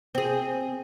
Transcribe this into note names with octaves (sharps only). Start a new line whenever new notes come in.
C4 G#4